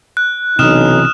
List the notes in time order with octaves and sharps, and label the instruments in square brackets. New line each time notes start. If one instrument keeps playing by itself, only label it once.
[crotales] F#6
[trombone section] B1 C#4 D#4 [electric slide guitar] C3 E3 [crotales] D#6 F6 E7